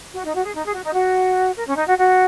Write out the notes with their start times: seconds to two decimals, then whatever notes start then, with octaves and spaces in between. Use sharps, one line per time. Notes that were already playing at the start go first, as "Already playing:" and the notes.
0.14 F#4
0.25 D#4
0.35 F#4
0.44 G#4
0.55 D#4
0.66 G#4
0.74 F#4
0.84 D#4
0.93 F#4
1.56 A#4
1.67 C#4
1.77 D#4
1.87 F#4
1.98 F#4